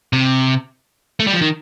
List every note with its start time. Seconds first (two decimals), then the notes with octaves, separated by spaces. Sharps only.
0.13 C3
1.20 A3
1.27 G3
1.34 F3
1.42 D#3